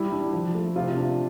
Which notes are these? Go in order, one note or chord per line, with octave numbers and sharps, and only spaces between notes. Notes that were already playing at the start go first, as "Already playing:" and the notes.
Already playing: G3 E4
D4
F3
A3
C3 F4
D4